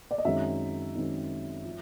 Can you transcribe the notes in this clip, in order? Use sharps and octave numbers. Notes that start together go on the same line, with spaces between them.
D5
D#5
F#2 D#3 G#3 C4 D#4 E5
F#2 D#3 G#3 C4 D#4
F3